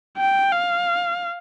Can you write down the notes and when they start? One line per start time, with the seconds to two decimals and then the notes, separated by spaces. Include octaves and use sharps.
0.17 G5
0.52 F5